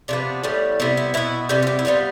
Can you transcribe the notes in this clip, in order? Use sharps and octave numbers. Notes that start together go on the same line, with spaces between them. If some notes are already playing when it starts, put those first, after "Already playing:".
C3 F3 B3 D4
A2 G3 B3
C3 G3 B3 E4
E4
B2 B3 E4
C3 G3 B3 G4
F4
G4
E4
C3 G3 B3 F4